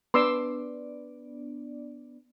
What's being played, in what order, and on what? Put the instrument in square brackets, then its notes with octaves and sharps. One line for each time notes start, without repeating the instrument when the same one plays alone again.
[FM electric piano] B3 D4 D5 [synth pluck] B4 [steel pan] C6 D6 E6